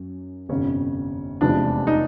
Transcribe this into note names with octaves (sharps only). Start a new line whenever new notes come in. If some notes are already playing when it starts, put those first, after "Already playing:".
Already playing: F#2 F#3 C#4
G1 F2 C3 C#4
F1 E2 C3 F3 G#3 D4
D#4